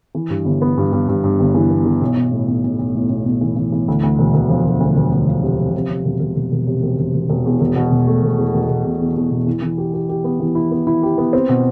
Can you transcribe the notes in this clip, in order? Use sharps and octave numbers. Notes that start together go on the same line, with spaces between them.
E3
G2
G1
B3
G2
G2
G2
G2
G1
E3
B3
E3
B1
B1
A2
B1
B1
B1
A2
B1
B1
E3
E3
E3
D2
D2
E1
E1
F3
E1
D2
E1
D2
F3
C3
F3
C3
C3
E1
E1
E1
E1
C3
E1
E1
E1
E1
E2
E1
B2
E1
A3
E1
E2
E1
E1
B2
E2
E2
B2
E3
E3
G4
G4
G4
B3
E3
E4
B3
E4
G4
B3
C4
B2